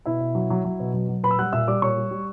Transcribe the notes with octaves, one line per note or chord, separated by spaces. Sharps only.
B2 E4 E5
B2
F#3
F#3
F#3
B2
F#3
F#3
A#2 B4 B5
E6
G3 F#5 F#6
A#2 E5 E6
G3 D5 D6
A#2 C#5 C#6
G3
G3